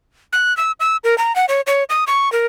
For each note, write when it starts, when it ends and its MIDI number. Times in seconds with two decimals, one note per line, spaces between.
0.33 0.56 90
0.57 0.72 88
0.80 0.97 88
1.04 1.17 70
1.18 1.35 82
1.36 1.46 78
1.49 1.61 73
1.67 1.84 73
1.90 2.04 87
2.07 2.32 85
2.32 2.46 70